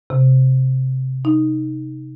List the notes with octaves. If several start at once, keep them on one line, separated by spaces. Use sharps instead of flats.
C3
D#4